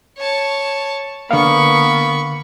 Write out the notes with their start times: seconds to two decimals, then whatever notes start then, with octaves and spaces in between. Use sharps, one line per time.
0.18 C#5 A5
1.31 D3 A#3 B3 F5 B5 C#6